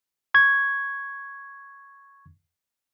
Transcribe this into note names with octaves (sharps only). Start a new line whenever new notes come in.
C#6 G#6